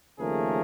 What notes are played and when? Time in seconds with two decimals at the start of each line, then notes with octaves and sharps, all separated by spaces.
0.20 D#2 C#3 F3 A3 G#4 A#4